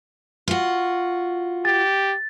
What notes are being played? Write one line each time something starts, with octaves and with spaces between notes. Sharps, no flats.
F4 F#4
G4 A6